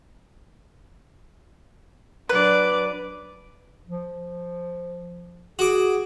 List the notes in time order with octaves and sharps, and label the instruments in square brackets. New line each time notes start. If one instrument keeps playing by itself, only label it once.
[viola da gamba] F#3 D4 D5 [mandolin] B4
[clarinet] F3
[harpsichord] F#4 D6 [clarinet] G#4